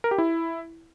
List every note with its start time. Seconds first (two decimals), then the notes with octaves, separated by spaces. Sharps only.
0.04 A#4
0.11 G4
0.18 E4